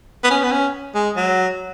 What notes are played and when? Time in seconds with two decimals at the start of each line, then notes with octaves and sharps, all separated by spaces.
0.24 B3
0.30 C#4
0.44 B3
0.51 C#4
0.95 G#3
1.16 F#3